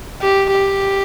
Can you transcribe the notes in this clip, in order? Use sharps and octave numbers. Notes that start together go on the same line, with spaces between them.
G4
G4